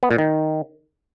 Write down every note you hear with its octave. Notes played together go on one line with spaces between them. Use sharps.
B3
A#2
D#3